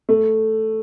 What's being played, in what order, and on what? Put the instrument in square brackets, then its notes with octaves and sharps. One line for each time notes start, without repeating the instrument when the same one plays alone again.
[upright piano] A3